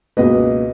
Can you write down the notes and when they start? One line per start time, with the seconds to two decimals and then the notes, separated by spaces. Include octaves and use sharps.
0.17 C#2 B2 A#3 B4 D#5